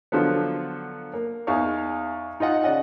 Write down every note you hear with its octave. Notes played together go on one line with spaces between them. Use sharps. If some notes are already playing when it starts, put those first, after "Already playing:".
D3 F3 F#3 B3
A#3
E2 D#4 F5 G#5 C#6
D#4 F4 D#5 F#5
C#3 D5 D#5 F#5